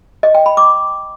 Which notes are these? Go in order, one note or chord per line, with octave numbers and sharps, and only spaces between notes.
D#5
G5
B5
D6